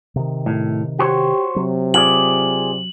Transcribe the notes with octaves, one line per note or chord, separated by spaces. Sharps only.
C3 D#3
A2
F#4 G4 C5 C#5
C3 F#3
F4 G#4 D5 F#7